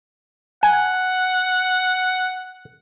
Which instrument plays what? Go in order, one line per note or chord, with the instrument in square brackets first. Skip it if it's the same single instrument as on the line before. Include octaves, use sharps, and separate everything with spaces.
[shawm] F#5 [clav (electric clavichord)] G#5